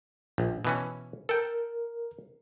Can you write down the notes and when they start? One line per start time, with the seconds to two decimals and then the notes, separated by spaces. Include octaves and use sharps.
0.38 A#1
0.65 B2 E3 C#4
1.29 A4 A#4 G5